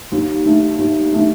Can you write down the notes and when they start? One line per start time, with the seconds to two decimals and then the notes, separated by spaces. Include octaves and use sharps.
0.12 D#2
0.45 D#3 A3
0.78 D#2
1.12 D#3 A3